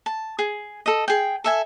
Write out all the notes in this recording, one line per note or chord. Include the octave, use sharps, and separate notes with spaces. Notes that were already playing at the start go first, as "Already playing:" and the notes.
A5
G#4
A4 D#5
G#4 G5
A4 E5 G#5